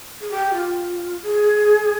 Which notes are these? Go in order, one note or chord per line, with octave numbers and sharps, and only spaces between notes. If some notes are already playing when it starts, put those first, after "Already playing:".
G#4
G4
F4
G#4